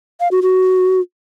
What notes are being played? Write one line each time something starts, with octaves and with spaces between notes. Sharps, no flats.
F5
F#4
F#4